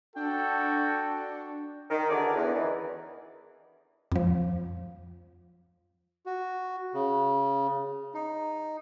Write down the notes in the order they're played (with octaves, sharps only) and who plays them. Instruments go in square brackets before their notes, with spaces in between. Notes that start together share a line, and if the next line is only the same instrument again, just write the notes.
[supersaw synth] D4 [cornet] F#4 [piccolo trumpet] A4 [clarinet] G5
[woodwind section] D#3
D3 E3 F#4 G#4 A#4 D5
E2
F#2 D#3 E3
[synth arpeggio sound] F2 F3
[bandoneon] F#4
C#3
D#4